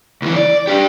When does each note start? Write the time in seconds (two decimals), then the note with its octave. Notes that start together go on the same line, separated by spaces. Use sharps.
0.22 C#2 E3
0.36 D5
0.67 D4 G4